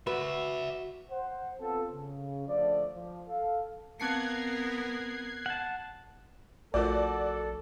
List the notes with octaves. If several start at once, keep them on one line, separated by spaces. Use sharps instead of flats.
F#4 B4 D5 E5
C5 F#5
B3 C4 F4 A4
C#3
D3 F3 A3 D5
F3
A4 F5
B3 C4 A#4 A5 F#6 G#6 C7 C#7
F#5 A5
A#1 A3 F4 F#4 A4 A#4 D5